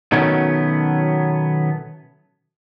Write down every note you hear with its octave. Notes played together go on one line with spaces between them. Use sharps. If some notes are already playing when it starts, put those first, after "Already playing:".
B2 D#3 F#3 A3 B3 C#4